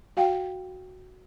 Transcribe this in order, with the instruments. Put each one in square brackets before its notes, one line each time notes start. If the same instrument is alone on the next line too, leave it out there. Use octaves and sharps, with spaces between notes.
[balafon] F#4 F5 G5